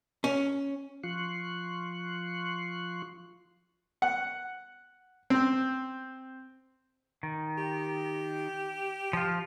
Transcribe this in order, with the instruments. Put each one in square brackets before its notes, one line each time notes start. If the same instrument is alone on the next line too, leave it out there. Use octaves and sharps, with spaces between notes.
[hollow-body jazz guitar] C#4
[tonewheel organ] F3 F4 C6 C#6 F#6
[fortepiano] F#5
C4
[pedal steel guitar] D#3
[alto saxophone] G4
[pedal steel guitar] F3 F4